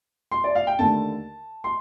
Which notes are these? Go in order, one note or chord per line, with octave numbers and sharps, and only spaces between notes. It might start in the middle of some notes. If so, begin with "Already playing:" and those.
C6
D5
F5
G5
D#2 D3 A3 A5
C6